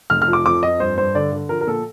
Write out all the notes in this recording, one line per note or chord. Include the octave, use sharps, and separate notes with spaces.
F1 F6
F6
F3
D6
F2 D6
F2 D#5
G2 C5
G2 C5
D3 D5
D3
F3 A#4
A#4
A#2 A4